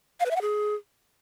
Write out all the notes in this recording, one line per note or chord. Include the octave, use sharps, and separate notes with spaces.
F5
B4
E5
F#5
G#4